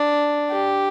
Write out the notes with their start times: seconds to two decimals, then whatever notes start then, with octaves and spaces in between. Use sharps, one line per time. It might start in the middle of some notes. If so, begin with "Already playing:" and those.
Already playing: D4
0.51 G4